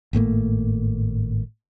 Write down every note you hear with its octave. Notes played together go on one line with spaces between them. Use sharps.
G#1 A2 A3 A#3